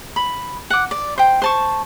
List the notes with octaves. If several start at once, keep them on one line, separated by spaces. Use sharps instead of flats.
B5
F#5 D6
D5
C5 G5
C5 A5 C#6